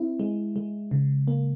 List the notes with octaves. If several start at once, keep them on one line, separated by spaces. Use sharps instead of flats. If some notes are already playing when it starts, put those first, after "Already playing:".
Already playing: C4 E4
G#3
G#3
C#3
A#3